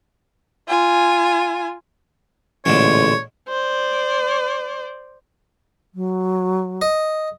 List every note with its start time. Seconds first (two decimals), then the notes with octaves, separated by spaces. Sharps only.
0.68 F4 G#5
2.66 A1 A#2 D3 G#3 C#5
3.49 C5 D5
5.95 F#3
6.82 D#5